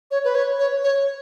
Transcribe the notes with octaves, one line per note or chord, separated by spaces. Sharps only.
C#5
B4
C#5
C#5
C#5